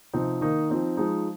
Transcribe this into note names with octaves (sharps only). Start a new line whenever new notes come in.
C3 F3 C4 D#4
D#3 A#3 D#4
F3 C4 D#4
F3 G#3 D#4